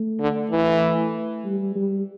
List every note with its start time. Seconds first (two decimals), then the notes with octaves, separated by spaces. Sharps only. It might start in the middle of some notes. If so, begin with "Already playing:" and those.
Already playing: A3
0.20 D3
0.51 E3
1.45 G3
1.75 G3